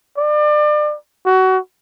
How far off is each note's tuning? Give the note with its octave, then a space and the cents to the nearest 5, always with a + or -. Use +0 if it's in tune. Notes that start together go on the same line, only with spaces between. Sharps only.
D5 +35
F#4 +25